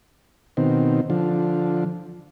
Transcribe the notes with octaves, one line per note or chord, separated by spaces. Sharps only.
B2 D#3 C4
D3 F3